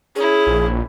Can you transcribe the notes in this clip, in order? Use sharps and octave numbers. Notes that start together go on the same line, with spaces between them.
C#4 E4 G#4
A#1